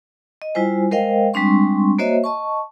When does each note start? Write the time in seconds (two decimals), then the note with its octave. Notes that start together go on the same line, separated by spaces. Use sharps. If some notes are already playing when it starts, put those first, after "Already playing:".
0.42 D#5
0.55 G3 E4 F4 C5 G#5
0.91 G#3 A#4 C5 D#5 F5 G5
1.34 G3 G#3 C4 D4 C6 C#6
1.99 A#3 F#4 C5 C#5 D#5 E5
2.24 D#5 A5 C#6